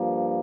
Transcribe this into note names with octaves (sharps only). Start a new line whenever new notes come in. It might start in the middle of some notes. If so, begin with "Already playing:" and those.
Already playing: G2 F3 A#3